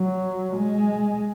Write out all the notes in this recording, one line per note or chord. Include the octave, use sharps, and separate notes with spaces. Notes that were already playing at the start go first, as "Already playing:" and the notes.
Already playing: F#3
G#3